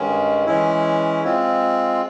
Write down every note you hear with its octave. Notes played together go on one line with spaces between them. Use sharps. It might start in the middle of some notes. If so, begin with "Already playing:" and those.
Already playing: G2 D#3 G#3 C#4
E3 G#3 C#4 E4
G#3 C4 F4